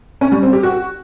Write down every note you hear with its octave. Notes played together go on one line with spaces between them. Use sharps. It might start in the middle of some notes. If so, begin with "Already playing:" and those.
C#4
G3
C4
G4
F#4